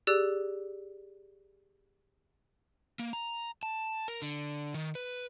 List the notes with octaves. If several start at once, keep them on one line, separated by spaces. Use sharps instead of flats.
G4 G#4 D5 E6 F#6
A#3
A#5
A5
A#4
D3
D#3
B4